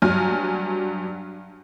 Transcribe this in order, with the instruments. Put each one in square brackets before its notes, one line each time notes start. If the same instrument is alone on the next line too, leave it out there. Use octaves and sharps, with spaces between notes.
[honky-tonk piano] G2 F#3 G#5 F6